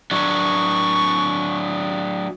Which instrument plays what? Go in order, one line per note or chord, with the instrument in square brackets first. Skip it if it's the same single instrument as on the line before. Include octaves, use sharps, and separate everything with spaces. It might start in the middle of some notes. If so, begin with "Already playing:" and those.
[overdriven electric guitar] F#3 D4 [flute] C#6